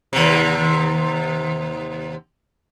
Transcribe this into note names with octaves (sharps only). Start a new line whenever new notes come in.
D#2 C3